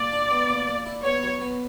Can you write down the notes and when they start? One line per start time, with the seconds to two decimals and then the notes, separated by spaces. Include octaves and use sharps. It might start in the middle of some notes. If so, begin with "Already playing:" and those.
Already playing: A#2 D5
0.12 D4
0.31 B3
0.49 A#2
0.67 A#2
0.86 E4
1.04 B3 C#5
1.23 F#3
1.42 B3